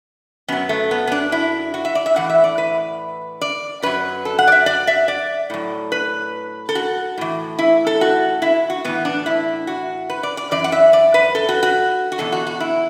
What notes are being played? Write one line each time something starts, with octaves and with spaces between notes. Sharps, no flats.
F#2 F#3 B3
A3
B3
B3
D4
E4
F#4
E5
D5
E5
A2 E3 F#5
E5
D5
B4
D5
F#2 F#3 B4
A4
F#5
D5
E5
D5
E5
D5
A2 F#3
B4
A4
F#4
A2 E3
E4
A4
F#4
E4
F#4
A2 E3 B3
D4
E4
F#4
B4
D5
D5
F#2 E3 D5
F#5
E5
D5
B4
A4
F#4
F#4
F#4
E2 B2 F#3 A4
F#4
F#4
E4